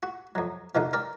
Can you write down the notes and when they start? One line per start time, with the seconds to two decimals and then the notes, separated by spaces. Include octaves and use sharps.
0.03 F#4
0.35 F2 F#3
0.75 D#2 D3 D#3 F3
0.93 A#4 D5 G5